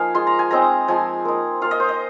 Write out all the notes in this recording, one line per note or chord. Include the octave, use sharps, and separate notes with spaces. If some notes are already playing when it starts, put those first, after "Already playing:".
Already playing: F3 A#3 D#4 F5 G#5
G#3 F4 C6
A#5
G#5
G#3 C4 D#4 A#5
F3 G#3 F4 G#5
A#3 D#4
A#3 F4 F5
D#5
C5
D#5